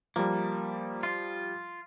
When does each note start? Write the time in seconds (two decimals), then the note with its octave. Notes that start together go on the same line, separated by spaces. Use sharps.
0.16 F3 G3 A#3
1.03 F4